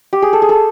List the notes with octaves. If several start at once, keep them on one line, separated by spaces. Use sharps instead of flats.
G4
G#4
A4
G#4
A4